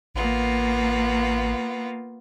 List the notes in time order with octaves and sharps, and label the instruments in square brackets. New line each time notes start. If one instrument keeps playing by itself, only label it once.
[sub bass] A1 [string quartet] A#3 B3 F4